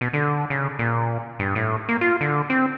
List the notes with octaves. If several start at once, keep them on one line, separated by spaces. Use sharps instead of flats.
B2
D3
C#3
A#2
G2
A2
A#3
F4
D3
C4